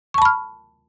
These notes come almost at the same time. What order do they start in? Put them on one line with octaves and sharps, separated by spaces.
C#6 A5 B5 F6